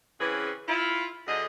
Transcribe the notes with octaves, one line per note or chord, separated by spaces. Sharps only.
C#3 E3 C4 C#4 G#4 B4
E4 F4
D2 D3 G#4 D#5